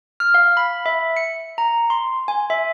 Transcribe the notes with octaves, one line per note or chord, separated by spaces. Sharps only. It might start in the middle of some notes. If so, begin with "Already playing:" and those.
F6
F5
B5
E5
C#7
A#5
C6
G#5
E5